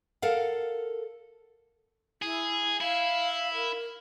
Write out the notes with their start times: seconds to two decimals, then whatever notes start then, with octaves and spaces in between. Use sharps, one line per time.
0.22 A4 A#4 F5 F#5
2.22 E4 G#4
2.80 E4 F5
3.54 A#4